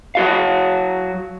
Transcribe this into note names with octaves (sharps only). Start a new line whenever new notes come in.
F#3 F#4 F5